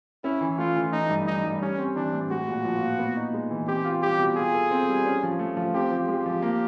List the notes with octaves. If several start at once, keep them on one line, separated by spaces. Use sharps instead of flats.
C#4 E4
E3
A3 F4
E3
A3 D#4
G2
E3 D#4
G2
G3 C#4
C4
E3 D4
A2
G#3 F#4
A#2
F3
A#2
B3
D#4
G#3
E3
C4 G4
F4
G3 G4
B2
F4 G#4
A4
C4
G3
C#4
F3
A3
F3
C4 G4
F3
G#3 G4
F3
A#3